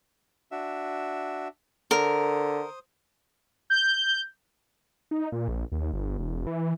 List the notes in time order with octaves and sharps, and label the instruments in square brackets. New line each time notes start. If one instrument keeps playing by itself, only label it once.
[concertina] D4 F#4 E5
[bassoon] D3 [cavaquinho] A#4 [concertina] C5 D#6
[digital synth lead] G6
[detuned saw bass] D#4
A#2
A#1
D#2
G1
E1
E3